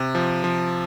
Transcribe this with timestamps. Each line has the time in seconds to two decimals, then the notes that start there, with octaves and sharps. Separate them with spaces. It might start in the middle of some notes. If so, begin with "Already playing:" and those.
Already playing: C3
0.15 F3
0.44 F3